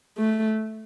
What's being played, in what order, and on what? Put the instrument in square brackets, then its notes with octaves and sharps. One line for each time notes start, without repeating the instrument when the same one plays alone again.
[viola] A3